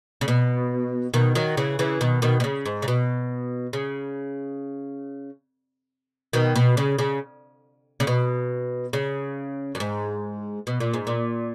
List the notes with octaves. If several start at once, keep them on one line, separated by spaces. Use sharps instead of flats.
C#3
B2
B2 D#3
D#3 F#3
C#3 E3
C#3 E3
B2 D#3
B2 D#3
B2
C#3
G#2
C#3
B2
C#3
B2 D#3
B2
C#3
C#3
C#3
B2
C#3
F#2
G#2
B2
A#2
G#2
A#2